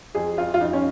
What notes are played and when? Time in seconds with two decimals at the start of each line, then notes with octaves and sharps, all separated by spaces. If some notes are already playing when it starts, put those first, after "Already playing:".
0.15 F2 G#4
0.38 F2 F4
0.54 F4
0.61 F2 D#4
0.73 C#4